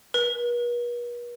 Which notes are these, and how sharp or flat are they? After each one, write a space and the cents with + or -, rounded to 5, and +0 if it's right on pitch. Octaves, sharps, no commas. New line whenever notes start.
B4 -45